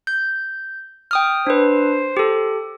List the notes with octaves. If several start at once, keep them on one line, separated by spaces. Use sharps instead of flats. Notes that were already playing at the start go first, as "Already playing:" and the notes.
G6
G5 D#6 F6
D4 B4 C5
G4 A4